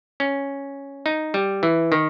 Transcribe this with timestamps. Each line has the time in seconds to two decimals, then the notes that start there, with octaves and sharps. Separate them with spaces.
0.20 C#4
1.06 D#4
1.34 G3
1.63 E3
1.92 D#3